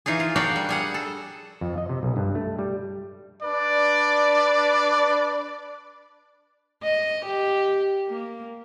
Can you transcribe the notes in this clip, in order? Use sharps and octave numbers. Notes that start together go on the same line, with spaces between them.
E3 D#4 F4 G#4
F4
D4 F#4 A#4 D5 F5 G5
G3
G3 G#4 F#5
A4
F2
D#5
C3
B1
G2
A3
G3
D4 B4 D5
D#5
G4
A#3